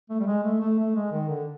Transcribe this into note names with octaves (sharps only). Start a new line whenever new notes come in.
A3
G3
G#3
A3
A3
A3
G#3
D#3
D3